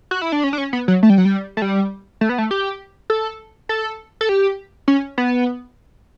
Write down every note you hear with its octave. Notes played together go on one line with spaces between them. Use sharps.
F#4
E4
D4
C#4
D4
C#4
B3
F#3
A3
G3
F#3
G3
A3
G3
A3
B3
A3
G4
A4
A4
A4
G4
C#4
B3